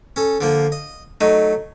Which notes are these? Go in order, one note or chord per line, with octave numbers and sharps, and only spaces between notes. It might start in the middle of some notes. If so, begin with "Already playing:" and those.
C#4 A4
D3 F3 A#3
D#5
F#3 A3 D#4